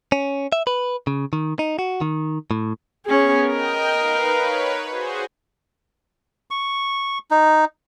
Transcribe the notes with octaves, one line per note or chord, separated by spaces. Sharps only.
C#4
E5
B4
C#3
D#3
D#4
F#4
D#3
A2
B3 C#4 G#4
A#4 D#5 G5
D#4 B4 F5
B4 C#5
F#4 G#4 C5
C#6
D#4